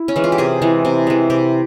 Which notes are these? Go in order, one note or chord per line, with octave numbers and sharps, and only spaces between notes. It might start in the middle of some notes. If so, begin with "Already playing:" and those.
Already playing: E4
C#4
E3 G#3
F4
G4
C3 G#4
E3 G#3
C3
E3 G#3
C3 G4